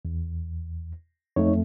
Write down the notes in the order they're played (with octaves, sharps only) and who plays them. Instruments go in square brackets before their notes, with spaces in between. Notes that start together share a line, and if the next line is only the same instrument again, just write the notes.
[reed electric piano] E2
[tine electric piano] F2 A3 [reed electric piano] D#4 C#5